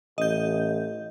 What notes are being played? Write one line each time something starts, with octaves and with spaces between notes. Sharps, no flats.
A1 D#5 G6